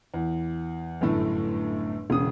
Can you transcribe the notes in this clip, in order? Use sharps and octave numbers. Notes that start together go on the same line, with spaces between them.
E2
G1 F#2 A2 A3
E1 C#3 D#6